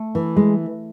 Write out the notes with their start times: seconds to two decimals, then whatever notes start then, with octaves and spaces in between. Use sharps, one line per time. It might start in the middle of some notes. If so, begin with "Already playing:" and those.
Already playing: A3
0.15 E3
0.36 G#3